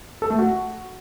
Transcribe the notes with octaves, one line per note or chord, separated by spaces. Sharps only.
A4
A3
F#4